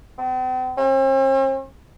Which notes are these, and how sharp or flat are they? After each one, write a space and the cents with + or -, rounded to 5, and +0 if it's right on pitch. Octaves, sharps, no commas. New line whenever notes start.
C4 -45
C4 +45